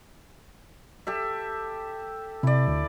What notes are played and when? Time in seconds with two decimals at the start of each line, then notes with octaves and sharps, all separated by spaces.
1.07 G4 A4 E5
2.43 C3 E4 D5
2.68 D2